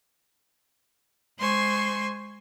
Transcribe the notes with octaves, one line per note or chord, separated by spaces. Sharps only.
G#3 C5 G#5 C6 C#6